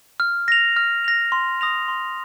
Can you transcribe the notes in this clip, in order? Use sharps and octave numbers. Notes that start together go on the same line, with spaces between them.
F6
A#6 F7
F6
A#6 F7
C6
D#6 A#6 F7
C6